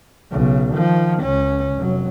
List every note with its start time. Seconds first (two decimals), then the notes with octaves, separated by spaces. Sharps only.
0.31 B1 C#3
0.74 D#3 F3
1.23 C#2 C#4
1.76 F1 F#3